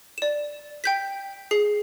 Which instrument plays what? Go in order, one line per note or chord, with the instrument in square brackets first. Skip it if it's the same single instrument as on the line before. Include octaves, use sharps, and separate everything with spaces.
[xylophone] D5 E7
G5 G6 B6
G#4 C7